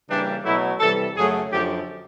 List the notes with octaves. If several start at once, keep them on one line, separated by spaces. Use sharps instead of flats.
C#3 E3 G3 A#3 D4
B2 F#3 A3 E4
C3 E3 G3 A4
F#2 C#3 F#3 A3 G#4
F#2 D3 F3 G4